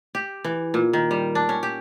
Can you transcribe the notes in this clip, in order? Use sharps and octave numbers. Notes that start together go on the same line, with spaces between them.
G4
E3
A#2
D#3
G3
D4
C#4
G4